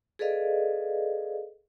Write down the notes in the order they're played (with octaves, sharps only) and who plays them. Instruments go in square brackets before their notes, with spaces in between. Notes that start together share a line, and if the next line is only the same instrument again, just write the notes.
[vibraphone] G#4 A4 B4 D5 D#5 F5